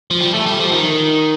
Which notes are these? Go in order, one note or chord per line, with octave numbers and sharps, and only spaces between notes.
F3
G3
A3
G3
F3
D#3